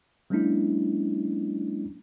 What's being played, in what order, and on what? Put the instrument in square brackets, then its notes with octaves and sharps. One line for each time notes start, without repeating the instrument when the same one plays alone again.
[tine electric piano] F#3 G#3 A#3 C#4 D4 E4